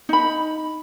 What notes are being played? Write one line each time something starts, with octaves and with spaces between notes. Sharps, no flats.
D#4 B5